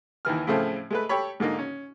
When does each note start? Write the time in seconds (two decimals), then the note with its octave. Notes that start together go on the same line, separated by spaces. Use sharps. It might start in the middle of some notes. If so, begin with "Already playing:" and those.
0.25 D#2 D#3 E3 F6
0.47 A2 C#3 F3 A3 C4
0.91 G#3 A3 B4
1.09 G4 A4 C#5 B5
1.40 G#2 D3 A#3 D#4
1.59 C#4